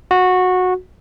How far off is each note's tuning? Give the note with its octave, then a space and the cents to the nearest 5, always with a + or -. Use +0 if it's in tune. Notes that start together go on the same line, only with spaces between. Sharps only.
F#4 -15